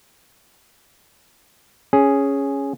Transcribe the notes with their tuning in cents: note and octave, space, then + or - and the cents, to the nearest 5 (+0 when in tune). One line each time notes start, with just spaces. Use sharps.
C#4 +0 G#4 +0